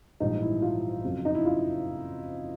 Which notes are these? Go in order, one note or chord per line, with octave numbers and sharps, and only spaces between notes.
A#1 G#2 E3 G3 D#4
E4
F4
F#1 F2 C#3 F#3
D#4
E4
F4